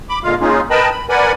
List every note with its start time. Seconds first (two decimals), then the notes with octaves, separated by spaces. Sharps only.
0.09 B5 D6
0.24 A#2 D3 G#3 F4 F5
0.41 G#3 A#3 C#4 D#4 F4 G#4
0.70 A#4 B4 D#5 G5 A5 B5
0.91 B5
1.09 A#4 B4 D5 F#5 G#5 B5